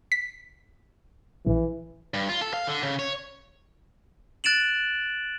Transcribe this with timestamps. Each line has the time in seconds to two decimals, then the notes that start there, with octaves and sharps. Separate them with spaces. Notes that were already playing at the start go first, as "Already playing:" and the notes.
0.12 B6
1.46 A#1 E3
2.14 G2
2.29 F4
2.41 A4
2.54 F5
2.67 D3
2.83 C#3
2.99 C#5
4.44 F#6 A6 D7 E7 F#7